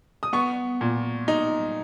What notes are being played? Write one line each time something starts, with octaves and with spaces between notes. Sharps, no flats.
D#6
B3 C#6
A#2
D#4